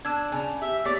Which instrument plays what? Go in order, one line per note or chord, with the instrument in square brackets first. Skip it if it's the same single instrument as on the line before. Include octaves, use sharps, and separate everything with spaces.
[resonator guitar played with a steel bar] D4 [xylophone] A5 E6 G#6
[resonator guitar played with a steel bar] C#3 [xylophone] D5 G#5 A5
[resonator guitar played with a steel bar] G4 [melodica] E5
[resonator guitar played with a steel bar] A#3 G4 C#5 [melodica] D5 [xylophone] B6